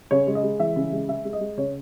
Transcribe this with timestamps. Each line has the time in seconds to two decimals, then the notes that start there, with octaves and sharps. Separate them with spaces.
0.11 C#3 C#5
0.27 G#3
0.35 D#5
0.43 G#3
0.60 E3 E5
0.76 C#3
0.92 G#3
1.08 G#3 E5
1.25 G#3
1.33 D#5
1.41 G#3
1.58 C#3 C#5